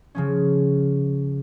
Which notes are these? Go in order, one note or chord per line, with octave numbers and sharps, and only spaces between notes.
C#3 F3 C#4